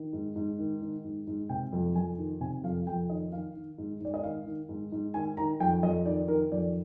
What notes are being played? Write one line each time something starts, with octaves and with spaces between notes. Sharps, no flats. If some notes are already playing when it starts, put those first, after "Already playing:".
Already playing: D#3
G#2
G#2
D#3
D#3
G#2
G#2
C3 G5
F2
F2 G#5
D#3
C3 G#5
F2 F5
F2 G5
D#3 D#5
D#3 F5
D#3
G#2
G#2 D5
D#5
D#3 F5
D#3
G#2
G#2
D#3 G#5
D#3 A#5
F2 G5
F2 D#5
D#3 D5
D#3 A#4
F2 D5